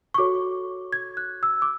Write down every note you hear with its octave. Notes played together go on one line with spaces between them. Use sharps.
C#6
F#4 A4 C#5 D6
G#6
F#6
E6
D6